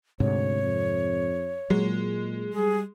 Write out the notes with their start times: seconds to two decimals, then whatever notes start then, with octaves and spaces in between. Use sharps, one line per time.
0.20 D2 G#2 C3 C#5
0.63 F2
1.70 A#2 F#3 G#3
2.53 G3 G#4